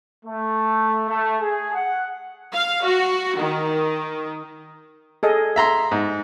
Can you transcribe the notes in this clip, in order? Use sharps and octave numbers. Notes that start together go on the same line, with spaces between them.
A3
A3
G#4
F#5
F5
F#4
D#3
G#4 A4 D#5
E5 A#5 C6
G#2